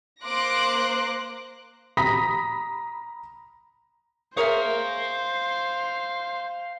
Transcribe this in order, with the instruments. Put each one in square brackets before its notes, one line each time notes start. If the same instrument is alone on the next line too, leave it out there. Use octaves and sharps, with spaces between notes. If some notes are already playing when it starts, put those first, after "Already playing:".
[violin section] A#3 C5 C6 D6 F#6 A#6
[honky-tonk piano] A#5 B5 D#6 A#6 B6
[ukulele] G#4 A#4 C#5 [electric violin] C5 [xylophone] E5 D#6 [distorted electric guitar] F5 A#5